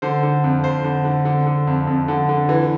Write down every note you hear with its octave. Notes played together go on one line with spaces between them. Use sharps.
D3 C5
D3
F2
F2 C5
D3
D3
D3
D3
F2
F2
D3
D3
E3